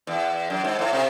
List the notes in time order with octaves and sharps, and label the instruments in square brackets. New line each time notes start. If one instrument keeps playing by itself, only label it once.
[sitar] E2
F#2
G#2
A2
C3